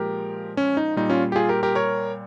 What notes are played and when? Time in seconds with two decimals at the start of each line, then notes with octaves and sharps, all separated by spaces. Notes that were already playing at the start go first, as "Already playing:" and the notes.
Already playing: A#2 F3 G#3 G4 A#4
0.57 C#4
0.77 D#4
0.97 A#2 G3 D#4
1.10 C#4 F4
1.32 G4
1.36 F4 G#4
1.49 G4 A#4
1.63 G4 A#4
1.75 A#4 C#5